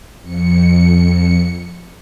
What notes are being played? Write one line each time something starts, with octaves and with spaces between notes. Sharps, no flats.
F2 C#7